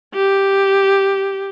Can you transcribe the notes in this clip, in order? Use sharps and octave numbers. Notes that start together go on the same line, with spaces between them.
G4